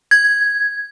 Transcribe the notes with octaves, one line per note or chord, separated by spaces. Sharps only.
G#6